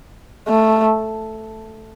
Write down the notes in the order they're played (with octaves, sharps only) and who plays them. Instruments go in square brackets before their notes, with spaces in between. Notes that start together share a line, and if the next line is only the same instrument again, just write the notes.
[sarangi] A3